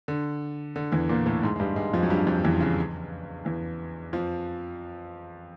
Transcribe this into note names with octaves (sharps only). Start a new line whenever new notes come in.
D3
D3
E2 E3
A#2 A#3
A2 A3
G#2 G#3
G#3
G2 G3
G#2 G#3
F2 F3
F#3
G2 G3
F2 F3
E2 E3
C#3
E2 E3
F2 F3